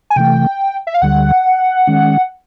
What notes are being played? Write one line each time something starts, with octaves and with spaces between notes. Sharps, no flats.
G#5
C3 E3 A3 G5
E5
F5
D2 D3 G3 F#5
D#3 G#3 C#4